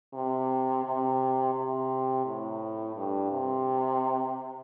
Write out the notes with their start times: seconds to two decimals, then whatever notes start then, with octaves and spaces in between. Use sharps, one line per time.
0.13 C3
0.84 C3
1.55 C3
2.26 A2
2.96 G2
3.32 C3